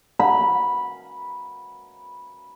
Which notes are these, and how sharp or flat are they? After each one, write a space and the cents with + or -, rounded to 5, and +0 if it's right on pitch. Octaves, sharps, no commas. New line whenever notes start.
B5 -10